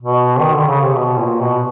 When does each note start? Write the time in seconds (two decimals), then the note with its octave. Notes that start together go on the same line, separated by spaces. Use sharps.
0.02 B2
0.40 D#3
0.53 D3
0.67 C#3
0.81 C3
0.95 B2
1.18 A#2
1.41 B2